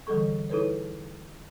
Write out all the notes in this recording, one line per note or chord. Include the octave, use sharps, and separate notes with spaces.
D3 E3 G3 G#4 A4 C#6
D#4 E4 G#4 A4 B4 C#5